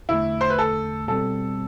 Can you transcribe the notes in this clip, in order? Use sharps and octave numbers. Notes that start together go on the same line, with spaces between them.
E2 D3 A3 E4
C5
B4
A4
B2 G3 C4 A4